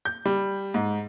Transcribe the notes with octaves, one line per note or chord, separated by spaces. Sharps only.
G6
G3
G#2